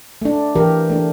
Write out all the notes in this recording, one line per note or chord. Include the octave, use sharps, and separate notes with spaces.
A3 D4
E3 G4 A#4
A3 D4